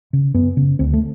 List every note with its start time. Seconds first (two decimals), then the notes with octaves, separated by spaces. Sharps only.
0.13 C#3
0.34 F#2 B3
0.57 C#3
0.79 D2 C4
0.93 A3